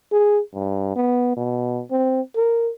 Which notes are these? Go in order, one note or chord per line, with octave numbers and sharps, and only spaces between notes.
G#4
G2
B3
B2
C4
A#4